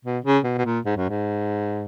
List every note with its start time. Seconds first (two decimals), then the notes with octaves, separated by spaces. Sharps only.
0.04 B2
0.24 C#3
0.44 B2
0.58 B2
0.65 A#2
0.85 G#2
0.96 F#2
1.09 G#2